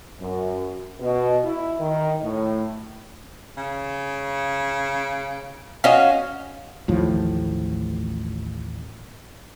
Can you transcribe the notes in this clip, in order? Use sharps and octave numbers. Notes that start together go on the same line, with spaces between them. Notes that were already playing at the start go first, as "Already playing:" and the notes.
F#2
B2
E4
D#3
A2
C#3
C#4 F#4 D#5 F5
A1 D#2 A2 F3